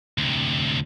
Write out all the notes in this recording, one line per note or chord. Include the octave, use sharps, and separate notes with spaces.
D2 C3